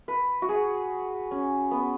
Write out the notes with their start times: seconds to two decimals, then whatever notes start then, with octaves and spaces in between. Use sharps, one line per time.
0.08 B4
0.42 F#4
0.49 G#4
1.31 C#4
1.71 B3